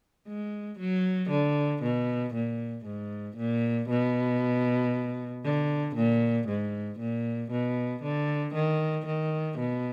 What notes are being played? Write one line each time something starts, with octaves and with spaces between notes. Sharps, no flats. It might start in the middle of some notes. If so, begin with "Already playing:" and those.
G#3
F#3
D3
B2
A#2
G#2
A#2
B2
D3
A#2
G#2
A#2
B2
D3
D#3
D#3
B2